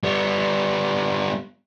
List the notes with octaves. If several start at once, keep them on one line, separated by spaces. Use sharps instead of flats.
G3 B3